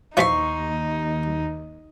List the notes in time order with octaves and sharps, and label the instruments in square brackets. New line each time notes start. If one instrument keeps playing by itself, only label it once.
[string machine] D#2 [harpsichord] E3 F3 E5 [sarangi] D#4 [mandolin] C6 C#6